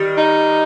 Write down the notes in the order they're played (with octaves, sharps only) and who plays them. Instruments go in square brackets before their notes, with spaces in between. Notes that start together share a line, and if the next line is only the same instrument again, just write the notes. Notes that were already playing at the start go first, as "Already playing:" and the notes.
Already playing: [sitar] D#3 G3
[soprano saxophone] D#4